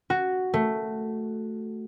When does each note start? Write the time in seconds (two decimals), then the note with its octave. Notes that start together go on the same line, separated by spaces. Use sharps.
0.10 F#4
0.54 A3